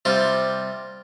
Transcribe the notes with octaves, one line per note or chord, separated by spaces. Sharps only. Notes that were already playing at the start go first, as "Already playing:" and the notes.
C3 G3 F4